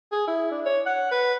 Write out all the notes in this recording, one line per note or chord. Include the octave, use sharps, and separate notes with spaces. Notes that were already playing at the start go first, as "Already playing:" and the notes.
G#4
E4
D4
C#5
F#5
B4